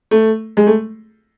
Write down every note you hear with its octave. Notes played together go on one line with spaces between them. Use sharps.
A3
G#3
A3